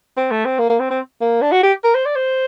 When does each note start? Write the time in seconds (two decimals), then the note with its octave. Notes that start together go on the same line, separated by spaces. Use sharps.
0.17 C4
0.31 A3
0.45 C4
0.59 A#3
0.70 A#3
0.80 C4
0.90 C4
1.21 A#3
1.42 D4
1.52 F#4
1.63 G4
1.84 A#4
1.95 C5
2.05 D5
2.16 C5